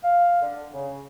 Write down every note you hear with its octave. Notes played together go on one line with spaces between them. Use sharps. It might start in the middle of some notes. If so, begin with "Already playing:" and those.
F5
D3
C#3